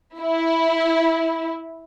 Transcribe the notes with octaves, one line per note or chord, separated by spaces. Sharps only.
E4